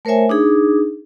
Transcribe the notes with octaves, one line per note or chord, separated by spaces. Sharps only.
A3 A#4 C5 C#5 E5 G#5
D4 D#4 G#4